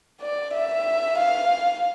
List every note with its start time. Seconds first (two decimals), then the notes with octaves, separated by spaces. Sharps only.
0.22 D5
0.54 E5
1.18 F5